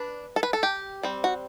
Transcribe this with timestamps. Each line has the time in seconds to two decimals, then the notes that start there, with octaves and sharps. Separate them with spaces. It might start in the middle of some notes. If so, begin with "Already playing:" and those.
Already playing: D4 B4
0.36 A4
0.43 B4
0.53 A4
0.63 G4
1.03 G3 C4
1.24 F#4